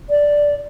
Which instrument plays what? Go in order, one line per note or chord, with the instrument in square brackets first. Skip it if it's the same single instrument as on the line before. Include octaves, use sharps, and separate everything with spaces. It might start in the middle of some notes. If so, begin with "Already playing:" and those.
[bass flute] D5